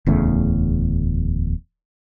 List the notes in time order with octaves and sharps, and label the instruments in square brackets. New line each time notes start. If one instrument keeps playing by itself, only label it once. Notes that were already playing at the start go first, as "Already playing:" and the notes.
[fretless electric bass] D1 E2 C#3 A3